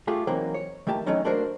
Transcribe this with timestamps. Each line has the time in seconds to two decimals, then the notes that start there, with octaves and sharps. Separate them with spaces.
0.08 A3 F4 G4 G#4
0.27 E3 F#3 A#3 C4 D#4
0.54 C#5
0.87 D#3 A3 A#3 G4 A5
1.06 D#3 E3 F#3 A3 C#4 D#4
1.25 A3 A#3 D4 F#4 A#4 C5